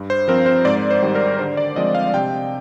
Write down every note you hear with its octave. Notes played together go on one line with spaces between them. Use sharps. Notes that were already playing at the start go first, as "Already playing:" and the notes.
Already playing: G2
C5
F3 C4 A#4
C5
G#2 D5
C5
D#3 G3
A#4
D3 C5
D5
F3 G#3 C4 D#5
F5
C3 G5